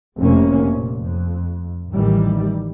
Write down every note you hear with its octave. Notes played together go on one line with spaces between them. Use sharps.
F1 C3 A#3 C#4
A#2
F2
A1 D#3 E3 G3